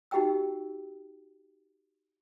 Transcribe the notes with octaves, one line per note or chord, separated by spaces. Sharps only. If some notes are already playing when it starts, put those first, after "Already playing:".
D#4 F#4 G4 D#5 G5 E6